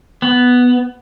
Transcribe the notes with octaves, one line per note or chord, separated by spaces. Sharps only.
B3